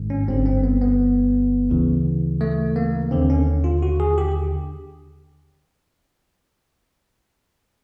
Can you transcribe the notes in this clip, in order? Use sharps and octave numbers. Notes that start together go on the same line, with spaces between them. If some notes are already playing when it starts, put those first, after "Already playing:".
Already playing: A1 G#2 D#3
C#4
G1 G2 D3 C4
C4
B3
B3
D2 C#3 E3
A3
A#3
D#2 D3 C4
C#4
F4
F#4
G#4
G4